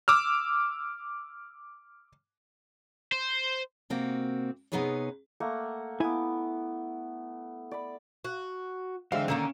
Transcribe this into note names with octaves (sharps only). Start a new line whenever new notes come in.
D6 E6 F6
C5
C3 A#3 C4 F#4
C3 B3 D#4 G#4 B4 C#5
A3 A#3 F#5
B3 E4 G#5 D6
D5 B5
F#4
D3 E3 G#3 C4 E5 F5
D3 D#3 A#3 C#4 E7